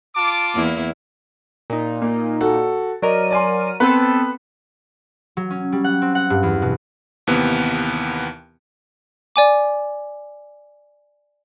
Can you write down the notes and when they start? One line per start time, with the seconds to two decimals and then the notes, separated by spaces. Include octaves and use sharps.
0.16 F4 A5 D6
0.55 E2 A#3 E4
1.70 A#2 D#4
2.02 A#3
2.41 F#4 A4
3.02 F#3 A#4 D5 D#5 D#7
3.30 D5 G#5 C6
3.80 B3 C4 A4 B4
5.37 F#3
5.51 C#4
5.72 G3
5.84 F#5
6.02 C4
6.15 F#5
6.30 G2
6.43 E2
6.62 B2
7.27 D#2 C3 E3 B3
9.36 D5 G#5 D6